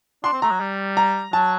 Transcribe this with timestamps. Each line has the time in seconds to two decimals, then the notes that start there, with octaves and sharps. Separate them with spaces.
0.24 D4 C6
0.33 C4
0.42 A3 A#5
0.51 F#3
0.60 G3
0.97 A#5
1.33 F#3 A5